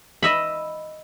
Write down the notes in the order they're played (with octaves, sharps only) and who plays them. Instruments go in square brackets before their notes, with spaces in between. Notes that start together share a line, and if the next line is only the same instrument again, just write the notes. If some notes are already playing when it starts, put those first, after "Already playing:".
[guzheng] D#5 E5 B5